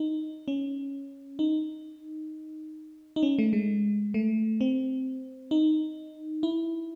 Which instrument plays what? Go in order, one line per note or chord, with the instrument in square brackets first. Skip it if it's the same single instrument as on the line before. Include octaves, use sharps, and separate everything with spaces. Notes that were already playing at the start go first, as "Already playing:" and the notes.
Already playing: [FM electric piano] D#4
C#4
D#4
D#4
C#4
A3
G#3
A3
C4
D#4
E4